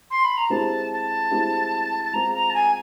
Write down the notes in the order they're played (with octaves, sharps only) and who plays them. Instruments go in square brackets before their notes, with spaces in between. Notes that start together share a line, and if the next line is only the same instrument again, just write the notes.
[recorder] C6
B5
A#5
[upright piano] G#3 C4 E4 G4 C5 [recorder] A5
[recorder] A5
[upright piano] G#3 C4 E4 G4 C5
[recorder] A5
[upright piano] G#3 C4 F4 G#4 [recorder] A#5
[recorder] A#5
A5
G#5